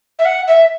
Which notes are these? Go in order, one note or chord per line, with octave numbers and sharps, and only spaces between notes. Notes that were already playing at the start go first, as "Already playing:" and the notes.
E5
F#5
E5